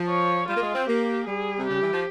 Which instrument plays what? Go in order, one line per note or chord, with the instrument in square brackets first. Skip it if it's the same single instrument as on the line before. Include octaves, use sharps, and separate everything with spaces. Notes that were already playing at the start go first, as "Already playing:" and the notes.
Already playing: [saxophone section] F3
[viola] C#5
[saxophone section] G3 [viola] F4
[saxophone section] A#3
G#3
C4
[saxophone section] A#3 [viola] G4
[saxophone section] G3 [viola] G#4
[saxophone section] C3
[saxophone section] C#3 [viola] G4
[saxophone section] E3
F3